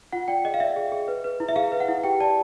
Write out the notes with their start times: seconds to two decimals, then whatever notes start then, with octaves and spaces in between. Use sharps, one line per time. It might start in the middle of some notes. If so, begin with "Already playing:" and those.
0.13 F4 F#5
0.28 D5 G5
0.45 G#4 D#5
0.54 F5
0.60 D5 E5
0.76 G#4
0.92 G#4
1.08 B4
1.24 B4
1.40 E4
1.48 E5
1.56 G#4 F5
1.72 B4
1.80 F#5
1.88 E4
2.03 G4 G5
2.20 D5 A5